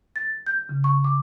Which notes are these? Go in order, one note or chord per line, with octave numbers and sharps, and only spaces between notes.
A6
G6
C#3
C#6
D6